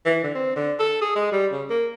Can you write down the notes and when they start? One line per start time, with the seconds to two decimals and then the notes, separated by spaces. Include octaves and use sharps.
0.05 E3
0.23 D3
0.35 C4
0.56 D3
0.79 A4
1.01 G#4
1.15 G#3
1.32 G3
1.52 C#3
1.70 A#3